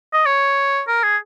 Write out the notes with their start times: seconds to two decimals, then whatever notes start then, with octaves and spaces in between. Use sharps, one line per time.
0.13 D#5
0.26 C#5
0.88 A#4
1.03 G#4